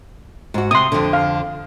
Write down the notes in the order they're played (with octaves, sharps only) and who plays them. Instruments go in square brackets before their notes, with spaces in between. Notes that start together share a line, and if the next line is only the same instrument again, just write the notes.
[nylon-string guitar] G#2 F#4
[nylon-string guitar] C3 [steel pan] C6 D#6
[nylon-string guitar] F2 D3
[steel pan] F5